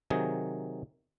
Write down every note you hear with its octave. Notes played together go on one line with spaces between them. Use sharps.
C3 D#3 F#3 G#4